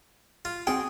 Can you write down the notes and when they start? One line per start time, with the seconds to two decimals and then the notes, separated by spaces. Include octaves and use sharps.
0.45 F4
0.67 C4 F#4 G#4 G5